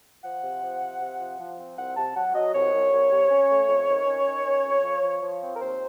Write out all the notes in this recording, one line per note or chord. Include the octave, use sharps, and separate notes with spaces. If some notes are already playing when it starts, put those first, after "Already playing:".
F3 F#5
C3
F3
C3
C3
F3
F3
C4
C2 F#5
C3 A5
F#3 F#5
F#3 D#5
C2 C#5
C2
C2
C3
C#4
A3
F2
D#3
C#4
D#3
C#4
F2
F3
F3
F3
C4
A#4
D#2 C5